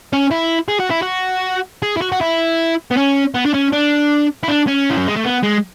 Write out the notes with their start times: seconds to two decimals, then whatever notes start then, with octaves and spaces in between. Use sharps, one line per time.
0.13 C#4
0.31 E4
0.68 G#4
0.80 F#4
0.91 E4
1.03 F#4
1.82 G#4
1.97 E4
2.01 F#4
2.12 F#4
2.21 E4
2.91 B3
2.97 C#4
3.35 B3
3.46 D4
3.54 C#4
3.73 D4
4.43 E4
4.48 D4
4.68 C#4
4.91 E3
4.98 F#3
5.08 G#3
5.17 A3
5.24 B3
5.43 G#3